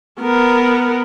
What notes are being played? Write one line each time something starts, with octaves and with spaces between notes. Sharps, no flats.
B3 A#4